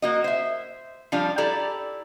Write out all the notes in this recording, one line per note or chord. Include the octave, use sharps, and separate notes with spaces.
A#3 F#4 D#5
C5 E5
F3 G3 D4 F4
E4 G4 A4 D5 A#5